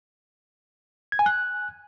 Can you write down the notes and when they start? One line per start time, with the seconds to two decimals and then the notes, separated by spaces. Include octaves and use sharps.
1.12 G#6
1.19 G#5
1.26 F#6